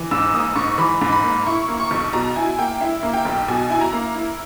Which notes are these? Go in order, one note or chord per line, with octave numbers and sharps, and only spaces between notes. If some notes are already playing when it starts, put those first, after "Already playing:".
Already playing: E3
G#2 E6
A#3 D#6
G#2 C#6
E3 B5
G#2
B5
A#3
E4 C#6
A#3
C#6
B1
B2 A#5
E4 G#5
A#3 G5
E4 E5
A#3
G5
B1
B2 G#5
E4 G#5
A#5
A#3
E4